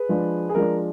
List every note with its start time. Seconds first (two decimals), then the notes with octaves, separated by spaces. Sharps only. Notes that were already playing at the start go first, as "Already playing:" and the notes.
Already playing: G#4 B4
0.09 F3 G#3 D4
0.49 G#4
0.55 F3 G#3 D4 A#4